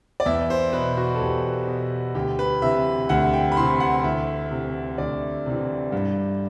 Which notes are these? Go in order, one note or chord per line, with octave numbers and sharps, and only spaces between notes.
D5
E2 E5
C5
B2 B4
F#4
A4
E2 G4
B2
D2 G4
B4
C3 E3 E5
D2 F#5
G5
B5
C3 E3 C6
F#5
D2 E5
C3 E3
D2 D5
C3 E3
G2